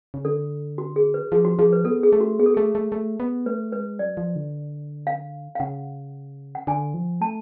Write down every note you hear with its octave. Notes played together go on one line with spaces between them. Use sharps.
C#3
D3 A4
F#4
G#4
B4
F3 G#4
F#4
F3 G#4
B4
B3 A4
G#4
A3
F#4
B3 G#4
A4
A3 G#4
A3
A3
B3
A3 B4
G#3 B4
F#3 D5
F3
D3
F5
F5
C#3 F#5
F#5
D3 G#5
F3
A3 A5